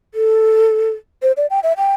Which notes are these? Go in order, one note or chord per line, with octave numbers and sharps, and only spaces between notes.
A4
C5
D5
G5
E5
G5